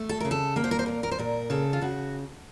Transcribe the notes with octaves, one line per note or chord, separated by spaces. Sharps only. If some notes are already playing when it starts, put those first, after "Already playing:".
Already playing: A3
A4
C#3 A#4
A4
A#3 A#4
C5
A#4
C5
A#2 A#4
A#4
C5
A#2 A#4
C#3 A4
F4
C#3 F#4